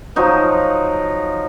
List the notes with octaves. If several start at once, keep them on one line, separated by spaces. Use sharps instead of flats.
F3 F#3 D#4 F5